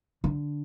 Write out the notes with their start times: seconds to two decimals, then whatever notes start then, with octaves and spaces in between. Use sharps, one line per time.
0.24 D3